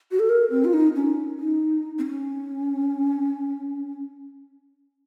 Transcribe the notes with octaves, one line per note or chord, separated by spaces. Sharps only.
F#4
A4
A#4
C4
F4
D#4
C#4
D#4
C4
C#4